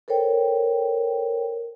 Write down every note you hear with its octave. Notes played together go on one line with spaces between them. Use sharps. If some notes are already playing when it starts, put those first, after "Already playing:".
A4 A#4 C5 C#5 G5